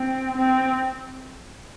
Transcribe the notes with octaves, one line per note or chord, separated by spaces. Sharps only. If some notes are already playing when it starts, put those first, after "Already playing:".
Already playing: C4
C4